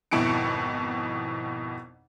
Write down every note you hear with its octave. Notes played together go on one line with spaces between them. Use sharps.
G#1 F2 B2 E4 C#7 D7